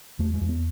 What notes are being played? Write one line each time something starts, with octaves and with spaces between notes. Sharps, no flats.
E2 A3
G#3
E2
B3